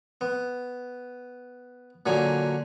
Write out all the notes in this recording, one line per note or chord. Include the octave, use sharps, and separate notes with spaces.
B3
A#2 D3 F#3 G#5